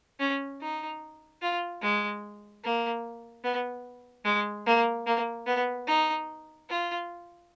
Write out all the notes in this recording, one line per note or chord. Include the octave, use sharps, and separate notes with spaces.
C#4
D#4
F4
G#3
A#3
B3
G#3
A#3
A#3
B3
D#4
F4